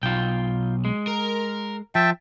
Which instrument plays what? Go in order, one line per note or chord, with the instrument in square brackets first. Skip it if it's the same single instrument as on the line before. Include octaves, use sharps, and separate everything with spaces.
[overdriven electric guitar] B1 [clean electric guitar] F4 G5
[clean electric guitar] G#3
[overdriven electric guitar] A#4
[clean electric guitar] F3 [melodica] E5 G5 A5